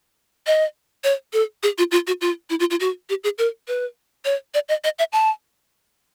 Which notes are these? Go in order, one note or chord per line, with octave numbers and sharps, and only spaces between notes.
D#5
C#5
A4
G#4
F4
F4
F#4
F4
E4
F4
F4
F#4
G4
G#4
A#4
B4
C#5
D5
D#5
D#5
E5
A5